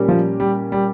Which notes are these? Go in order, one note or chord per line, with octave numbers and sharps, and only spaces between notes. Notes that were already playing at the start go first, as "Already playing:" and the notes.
Already playing: A#2 G3 C#4 G4 A#4
F3
G3
G3